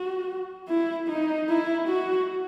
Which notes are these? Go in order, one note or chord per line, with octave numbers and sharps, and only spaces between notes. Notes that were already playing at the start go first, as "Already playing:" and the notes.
Already playing: F#4
E4
D#4
E4
F#4